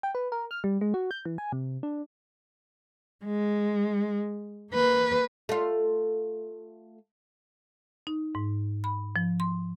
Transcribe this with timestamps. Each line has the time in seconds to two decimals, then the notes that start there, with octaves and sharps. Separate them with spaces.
0.03 G5
0.15 B4
0.32 A#4
0.51 F6
0.64 G3
0.81 G#3
0.94 F#4
1.11 G6
1.25 E3
1.38 G#5
1.52 C3
1.83 D4
3.25 G#3
4.72 A#3 B4
5.49 A3 F4
8.07 D#4
8.35 G#2
8.84 B5
9.16 F3
9.40 C6